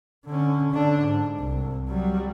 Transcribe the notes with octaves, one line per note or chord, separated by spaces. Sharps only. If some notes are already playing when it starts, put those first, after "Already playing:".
D3 C#4
D3 D4
G#2
C2
F#3 G3